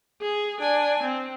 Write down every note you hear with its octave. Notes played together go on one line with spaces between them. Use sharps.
G#4
D4 G#5
C4